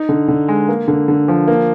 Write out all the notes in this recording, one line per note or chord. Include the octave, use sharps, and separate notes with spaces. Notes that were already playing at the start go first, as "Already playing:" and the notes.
Already playing: D#4
D3
D3
G#3
A#3
D3
D3
F3
A#3